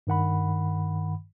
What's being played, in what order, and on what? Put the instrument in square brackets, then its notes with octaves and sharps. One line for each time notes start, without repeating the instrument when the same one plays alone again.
[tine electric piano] G2 D#3 F#5 B5